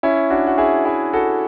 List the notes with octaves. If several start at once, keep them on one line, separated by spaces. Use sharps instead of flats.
C#4 E4
D4 F#4
F#4
E4 G#4
E4 G#4
F#4 A4